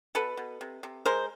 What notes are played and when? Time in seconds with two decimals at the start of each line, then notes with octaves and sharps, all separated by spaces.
0.15 B2 A4 B4
0.37 B2
0.61 C3
0.83 C3
1.06 G#3 A#4 C5